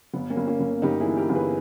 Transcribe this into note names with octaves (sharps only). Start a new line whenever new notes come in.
G1 B3
A#3 C#4
G1
A#3 C#4
G1
G1 D#4 G4
E4 G#4
E3
G4 A#4
G1
G#4 B4